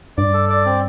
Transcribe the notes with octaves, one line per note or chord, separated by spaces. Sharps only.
G2 D5
A4
D5
C4